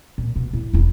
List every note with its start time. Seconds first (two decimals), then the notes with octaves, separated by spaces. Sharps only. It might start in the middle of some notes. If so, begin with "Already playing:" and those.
0.18 A#2
0.36 B2
0.53 A2
0.73 E1 E4